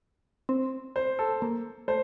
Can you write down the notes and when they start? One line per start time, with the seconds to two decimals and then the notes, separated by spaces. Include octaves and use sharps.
0.49 C4
0.96 C5
1.19 A4
1.42 A#3
1.88 A3 C5